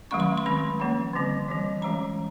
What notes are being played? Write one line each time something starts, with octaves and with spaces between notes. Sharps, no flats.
D#3 F#3 A3 C#4 C#6
C6
C6
D#3 G#3 C4 B5
F3 A#3 C#4
D3 G3 C4
E3 G3 C4
E3 G#3 C#4 A#5